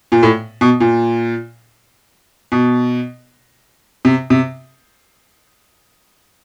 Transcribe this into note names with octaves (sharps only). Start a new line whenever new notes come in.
A#2
A2
B2
A#2
B2
C3
C3